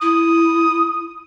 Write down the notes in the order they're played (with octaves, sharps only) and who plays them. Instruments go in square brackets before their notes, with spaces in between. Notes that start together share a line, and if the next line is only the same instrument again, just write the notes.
[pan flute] E4 [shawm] D#6